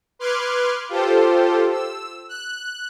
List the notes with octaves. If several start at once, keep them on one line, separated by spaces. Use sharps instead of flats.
B4 C6 D6 F6 F#6 G#6
F4 G4 A4 C5
E6
F#6